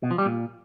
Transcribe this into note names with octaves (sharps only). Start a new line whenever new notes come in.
B2
F3
G3
A#2